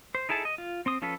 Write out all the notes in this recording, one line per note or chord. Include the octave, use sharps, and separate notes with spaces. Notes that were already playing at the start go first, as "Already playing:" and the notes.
C5
D#4 E4 G#4 A4 A5
D#5
F4
C4 C6 D#6
F3 C#4 F4 A4 B4